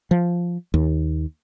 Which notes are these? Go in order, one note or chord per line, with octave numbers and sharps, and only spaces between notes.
F3
D#2